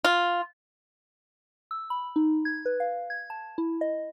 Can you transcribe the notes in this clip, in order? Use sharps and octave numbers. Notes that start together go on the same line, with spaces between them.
F4
E6
B5
D#4
G#6
B4
F5
G#6
A5
E4
D#5